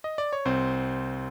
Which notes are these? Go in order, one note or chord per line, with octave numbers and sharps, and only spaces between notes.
D#5
D5
C#5
C2 C4 C5